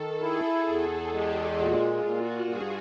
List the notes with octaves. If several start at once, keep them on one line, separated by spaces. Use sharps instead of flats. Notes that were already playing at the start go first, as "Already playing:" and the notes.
Already playing: D#3 A4
E4 G#4
E2 G#4
G#3 G4
A#2 F#4
F4
A#2
F#4
G2 G#4